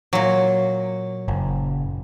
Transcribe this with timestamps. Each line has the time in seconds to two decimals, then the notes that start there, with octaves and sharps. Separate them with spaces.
0.13 A#2 F#3
1.28 F#1